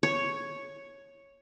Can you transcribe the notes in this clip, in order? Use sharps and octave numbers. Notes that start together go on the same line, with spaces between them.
C#5